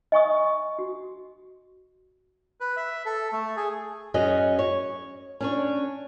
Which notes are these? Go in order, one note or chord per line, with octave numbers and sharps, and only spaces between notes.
D#5 G#5 C#6 D#6
F#4
B4
E5
A4
A3
G#4
F#2 C#4 F#4 G#4 D#5
C#5
C#4 D4 C#5